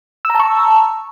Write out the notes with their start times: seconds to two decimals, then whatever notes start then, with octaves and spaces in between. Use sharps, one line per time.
0.25 E6
0.30 A#5
0.35 A5
0.40 C#6